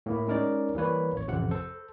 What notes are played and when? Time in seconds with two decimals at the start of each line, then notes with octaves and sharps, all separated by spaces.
0.06 A2 A#3 E4
0.27 G#3 C#4 D#4 A#4 C#5 D5
0.75 E3 G3 A#3 B4 C#5
1.13 A1 C#5
1.27 A1 F2 C3 F3 F#5
1.51 A4 C5